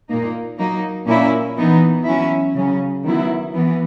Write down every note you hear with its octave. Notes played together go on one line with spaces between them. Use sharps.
A#2 A#3 D#4
F#3 A#3 D#4
A#2 A#3 C#4 E4
E3 B3 D#4
F#3 C#4 E4
C#3 F#3 C#4
D#3 F#3 B3 E4
E3 B3